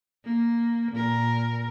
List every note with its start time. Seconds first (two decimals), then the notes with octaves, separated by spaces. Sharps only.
0.24 A#3
0.92 A#2 A#4